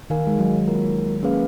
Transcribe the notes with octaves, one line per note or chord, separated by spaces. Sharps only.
D#3 D#4 A#4 F5 G#5
G#3
F#3
A#3 F4 A#4
A#3 C#4 G#4 B4 F5